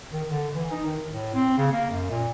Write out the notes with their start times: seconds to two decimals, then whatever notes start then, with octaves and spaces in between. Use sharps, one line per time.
0.13 D#3
0.29 D3
0.55 E3
0.71 D#4
0.86 D#3
1.09 A2
1.34 C4
1.58 C#3
1.72 A#3
1.90 F#2
2.11 A#2